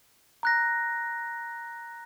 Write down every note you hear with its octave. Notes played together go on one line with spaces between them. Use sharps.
A#5 F#6 A#6